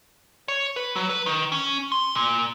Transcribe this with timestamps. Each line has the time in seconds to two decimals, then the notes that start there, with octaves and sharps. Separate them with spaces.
0.48 C#5
0.76 B4
0.96 F#3
1.09 B4
1.26 D#3
1.52 C#4
1.92 C6
2.15 A#2